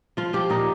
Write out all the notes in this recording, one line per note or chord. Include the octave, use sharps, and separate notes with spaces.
F3 F4
F3 G4
A#2 D#4